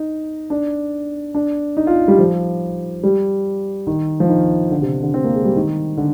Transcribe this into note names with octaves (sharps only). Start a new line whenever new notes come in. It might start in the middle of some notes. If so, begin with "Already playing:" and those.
Already playing: D#4
D4
D4
D#4
F4
G3
F3
G3
D#3
F3
D#3
D3
C3
D3
C4
A#3
G#3
G3
D#3
D3